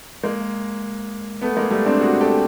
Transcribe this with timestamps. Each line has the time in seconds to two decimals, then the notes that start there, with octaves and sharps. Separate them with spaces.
0.23 G#3 A#3
1.41 A3 B3
1.57 G#3 A#3
1.71 G3 A3
1.86 C4 D4
2.01 F#4 G#4
2.21 G4 A4